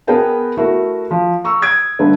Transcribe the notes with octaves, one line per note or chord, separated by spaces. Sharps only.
B3 G#4 A#4 B4 G5 A5
A3 E4 F#4 A#4
F3
A#5 C#6 E6
D#6 G#6 D7
G1 D3 B4